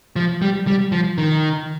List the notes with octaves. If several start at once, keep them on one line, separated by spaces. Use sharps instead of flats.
F3
G3
G3
F3
D#3